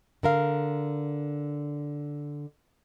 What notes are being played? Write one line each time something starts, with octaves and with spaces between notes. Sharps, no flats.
D3 A#4 F5